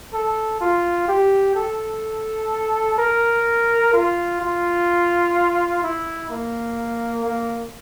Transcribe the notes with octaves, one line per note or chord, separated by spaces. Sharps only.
A4
F4
G4
A4
A#4
F4
F4
E4
A#3
A#3